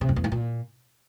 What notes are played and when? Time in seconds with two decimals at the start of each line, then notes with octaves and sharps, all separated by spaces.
0.01 C3
0.09 F2
0.16 E2
0.24 G#2
0.32 A#2